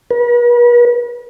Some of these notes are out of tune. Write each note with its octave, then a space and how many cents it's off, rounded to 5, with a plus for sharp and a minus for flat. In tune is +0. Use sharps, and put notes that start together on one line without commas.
B4 -45